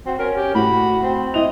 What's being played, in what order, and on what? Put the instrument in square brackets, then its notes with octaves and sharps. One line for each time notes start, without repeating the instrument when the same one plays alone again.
[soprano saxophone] C4 [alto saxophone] F#4
[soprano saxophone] C#4 [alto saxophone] A#4
[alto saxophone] G4
[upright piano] A2 [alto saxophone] F#4 [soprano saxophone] B5
[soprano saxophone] C4
[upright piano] E4 F7 [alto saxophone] D#5